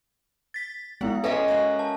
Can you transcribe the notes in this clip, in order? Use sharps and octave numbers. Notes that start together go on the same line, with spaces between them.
A6 B6
G#3 B3 E4 F#5
G#3 C#4 A4 B4 E5
A#3 F#4
A5